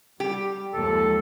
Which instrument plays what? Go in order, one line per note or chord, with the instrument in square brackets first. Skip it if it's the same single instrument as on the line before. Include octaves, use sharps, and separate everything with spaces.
[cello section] G3 [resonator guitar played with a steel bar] G4
[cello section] D#2 F3 G#3 [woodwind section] A4